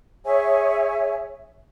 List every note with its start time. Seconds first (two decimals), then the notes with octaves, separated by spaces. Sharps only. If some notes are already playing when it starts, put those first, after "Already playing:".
0.24 G#4 C#5 E5 G#5